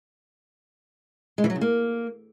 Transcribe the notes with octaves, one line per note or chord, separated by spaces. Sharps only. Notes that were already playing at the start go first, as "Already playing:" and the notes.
G#3
E3
F#3
C#3
A#3